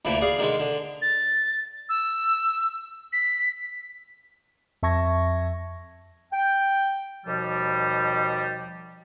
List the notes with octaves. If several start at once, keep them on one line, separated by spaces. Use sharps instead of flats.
D2 A#2 E3 A3 A5 D6
G#4 D5 F5
D3 D#3 G#3
D3
A6
E6
B6
F2 E5 A5 C#6 G#6 A#6
G5
D#2 B2 F3 G3